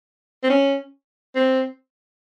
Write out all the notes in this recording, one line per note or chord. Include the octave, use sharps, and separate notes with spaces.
C4
C#4
C4